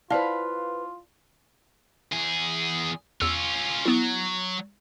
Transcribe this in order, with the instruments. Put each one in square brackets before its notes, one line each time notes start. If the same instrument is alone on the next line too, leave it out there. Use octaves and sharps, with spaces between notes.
[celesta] E4 C5 [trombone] F4 [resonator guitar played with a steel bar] B4 F5 [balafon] D5 A5
[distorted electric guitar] E2 G#4
[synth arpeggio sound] E2 E6 [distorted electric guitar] C#4 F4
[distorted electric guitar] F#3 [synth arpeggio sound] B3 E4